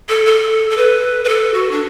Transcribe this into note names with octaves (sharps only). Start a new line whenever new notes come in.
A4
A4
A4
B4
B4
A4
F#4
D4